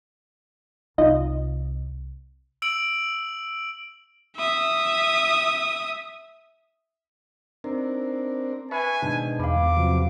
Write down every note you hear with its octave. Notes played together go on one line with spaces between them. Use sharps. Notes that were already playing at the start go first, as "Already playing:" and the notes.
C2 D#4 F4 D#5
E6 D7 F#7
E5 D#6
C4 D4 D#4 A#4
B4 E5 G#5 B5 C#6
G#2 B2 D#3 D4
E2 F5 B5 D6
C3 F3 F#3